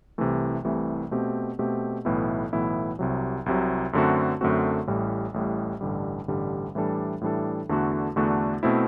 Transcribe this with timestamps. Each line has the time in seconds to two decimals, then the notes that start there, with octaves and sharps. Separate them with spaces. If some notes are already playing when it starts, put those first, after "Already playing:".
0.18 C2 C3 E3 A3
0.65 C2 C3 E3 A3
1.11 B2 A3 C4 G4
1.59 B2 A3 C4 G4
2.05 B1 A2 E3 B3 E4
2.53 B1 A2 E3 B3 E4
2.99 C2 C3 F#3
3.46 C2 C3 F#3
3.93 F#2 D3 A3 C4 F#4
4.41 F#2 D3 A3 C4 F#4
4.87 A1 A2 G3
5.34 A1 A2 G3
5.81 A1 G2 D3 G3
6.28 A1 G2 D3 G3
6.75 A2 E3 G3 D4 A4
7.21 A2 E3 G3 D4 A4
7.69 E2 D3 A3 D4 F#4
8.16 E2 D3 A3 D4 F#4
8.63 B2 A3 C4 E4